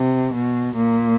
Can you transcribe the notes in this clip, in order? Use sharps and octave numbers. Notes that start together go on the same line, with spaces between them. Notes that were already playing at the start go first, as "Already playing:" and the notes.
Already playing: C3
B2
A#2